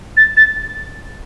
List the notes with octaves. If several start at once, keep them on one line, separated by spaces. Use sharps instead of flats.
A6
A6